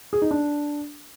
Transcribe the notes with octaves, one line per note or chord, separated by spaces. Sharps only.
G#4
D#4
D4